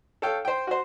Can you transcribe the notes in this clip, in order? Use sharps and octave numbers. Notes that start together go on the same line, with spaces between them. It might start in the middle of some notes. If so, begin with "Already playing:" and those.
A4 C#5 F5 G5
C5 G5
F#4 C5